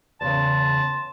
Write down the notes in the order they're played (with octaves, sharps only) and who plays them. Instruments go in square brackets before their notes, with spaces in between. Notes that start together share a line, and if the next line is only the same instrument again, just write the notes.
[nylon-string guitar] E2 C#3 [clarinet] A5 [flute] C6